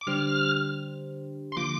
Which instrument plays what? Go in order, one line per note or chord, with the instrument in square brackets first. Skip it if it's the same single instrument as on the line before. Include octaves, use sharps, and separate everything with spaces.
[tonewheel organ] D6
[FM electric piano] D3 G3 D4 G4 C5 [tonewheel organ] F6
[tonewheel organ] C6
[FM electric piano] D3 F3 A#3 F4 [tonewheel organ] D6